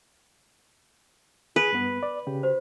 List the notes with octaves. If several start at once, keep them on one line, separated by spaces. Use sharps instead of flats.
G#4 B4
G2 B3
D5
C#3 G4
F#4 C5